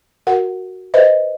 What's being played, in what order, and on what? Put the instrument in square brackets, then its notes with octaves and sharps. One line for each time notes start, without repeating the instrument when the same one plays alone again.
[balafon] F#4 A#4 F#5
B4 C5 D#5 E5